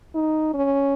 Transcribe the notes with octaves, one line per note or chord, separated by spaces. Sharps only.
D#4
C#4